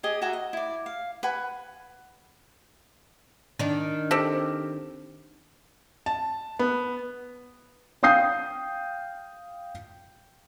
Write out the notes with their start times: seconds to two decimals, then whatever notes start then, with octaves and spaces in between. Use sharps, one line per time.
0.03 G4 G#4 D#5
0.22 F#4 E5 G#5 A#5
0.33 D#5
0.53 E4 D5
0.86 F5
1.23 B4 F#5 G#5 B5
3.59 D#3 D4
4.11 C4 G4 A4
6.06 A5
6.59 B3
8.03 F5 G5 D#6 G6 C7